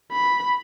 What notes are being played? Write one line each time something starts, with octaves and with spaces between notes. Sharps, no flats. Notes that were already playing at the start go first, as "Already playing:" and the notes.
B5